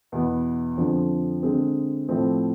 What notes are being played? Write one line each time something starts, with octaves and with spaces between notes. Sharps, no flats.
E2 B2 B3
F2 D3 F3
D3 G#3 C4
A2 F3 A3 C4